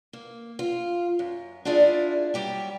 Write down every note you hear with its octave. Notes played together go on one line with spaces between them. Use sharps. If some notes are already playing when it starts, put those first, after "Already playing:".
A#3
F4
F#2
D4 E4 F4 G#4 D5
F#3 G3 G4 G5